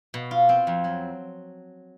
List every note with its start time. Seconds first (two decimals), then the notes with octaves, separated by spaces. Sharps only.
0.14 B2
0.31 F4
0.49 C4
0.67 F2
0.84 F#3